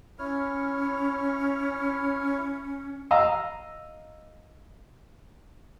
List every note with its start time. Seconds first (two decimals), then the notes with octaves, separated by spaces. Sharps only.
0.19 C#4 E4 C#5 F6
3.11 D#5 F5 A#5 E6